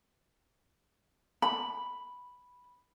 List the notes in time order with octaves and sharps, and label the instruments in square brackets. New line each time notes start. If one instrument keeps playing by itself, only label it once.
[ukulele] B5